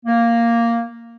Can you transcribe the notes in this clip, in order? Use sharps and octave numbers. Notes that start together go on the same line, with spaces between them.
A#3